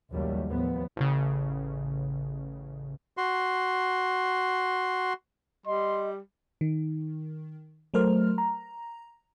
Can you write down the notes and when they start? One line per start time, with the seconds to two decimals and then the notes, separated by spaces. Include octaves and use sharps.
0.11 A#1 D#2 C#3 F#3 G3 A3
0.47 D#2 A2 F3 B3
0.96 A1 C#3
3.17 F#4 C6
5.66 G3 D#5 C6
6.61 D#3
7.94 F#3 A3 A#4 C5 F6
8.38 A#5